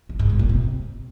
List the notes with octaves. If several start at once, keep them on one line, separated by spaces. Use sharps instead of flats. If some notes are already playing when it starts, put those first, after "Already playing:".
C#3
G#2
B2
A#2
C3